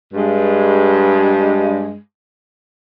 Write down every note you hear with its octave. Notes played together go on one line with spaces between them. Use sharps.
G2 G#3